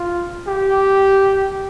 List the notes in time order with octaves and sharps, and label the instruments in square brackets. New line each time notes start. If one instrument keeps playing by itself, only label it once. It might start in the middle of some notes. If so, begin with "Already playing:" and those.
Already playing: [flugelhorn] F4
G4